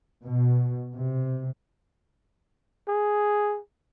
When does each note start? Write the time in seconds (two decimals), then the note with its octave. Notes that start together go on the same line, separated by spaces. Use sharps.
0.24 B2
0.95 C3
2.88 G#4